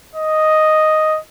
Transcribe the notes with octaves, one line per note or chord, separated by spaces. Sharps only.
D#5